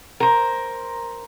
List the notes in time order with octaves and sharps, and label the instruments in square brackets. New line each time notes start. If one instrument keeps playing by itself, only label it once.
[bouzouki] A#4 C5